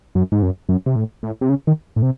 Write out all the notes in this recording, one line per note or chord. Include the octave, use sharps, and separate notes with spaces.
F#2
G#2
F#2
F#2
C3
A2
A2
C3
C#3
D#3
A2
C3